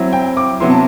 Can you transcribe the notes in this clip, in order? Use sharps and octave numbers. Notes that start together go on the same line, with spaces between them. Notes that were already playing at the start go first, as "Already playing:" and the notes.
Already playing: F#3 C4 E4
G5
D6
C3 F#3 B3 E4 C6
A5